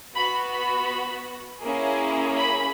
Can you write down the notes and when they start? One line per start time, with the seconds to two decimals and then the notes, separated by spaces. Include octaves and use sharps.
0.16 B3 F#4 B5
0.53 B5
1.64 A#3 C#4 E4 G#4
2.39 B5